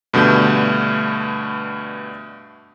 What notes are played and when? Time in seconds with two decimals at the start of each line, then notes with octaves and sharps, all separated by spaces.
0.14 G2 B2 D3 A3 G6